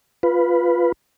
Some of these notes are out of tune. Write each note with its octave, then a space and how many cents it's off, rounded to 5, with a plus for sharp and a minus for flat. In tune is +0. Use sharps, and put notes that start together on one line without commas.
F4 +0 B4 +0